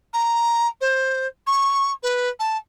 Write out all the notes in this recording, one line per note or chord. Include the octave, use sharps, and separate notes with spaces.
A#5
C5
C#6
B4
A5